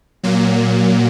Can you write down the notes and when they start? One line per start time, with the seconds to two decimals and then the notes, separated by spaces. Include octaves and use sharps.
0.23 A#2 F#3 A#3